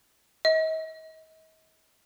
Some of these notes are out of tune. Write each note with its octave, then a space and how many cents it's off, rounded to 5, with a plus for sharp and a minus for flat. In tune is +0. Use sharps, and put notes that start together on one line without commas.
D#5 +40